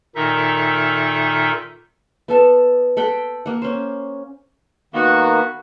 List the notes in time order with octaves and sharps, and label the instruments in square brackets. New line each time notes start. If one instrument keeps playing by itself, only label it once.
[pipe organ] A#2 D#3 D#4 A4 E5
[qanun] B3 A4 A5
A4 F#5 G5 B5
A#3 F#5
C#4 C5
[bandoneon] D#3 A#3 B3 [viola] F#4